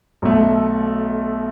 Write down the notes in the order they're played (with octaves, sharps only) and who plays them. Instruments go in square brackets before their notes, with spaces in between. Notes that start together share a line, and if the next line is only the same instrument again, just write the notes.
[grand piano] B1 B2 A3